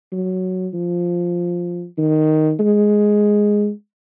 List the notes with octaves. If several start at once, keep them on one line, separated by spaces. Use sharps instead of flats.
F#3
F3
D#3
G#3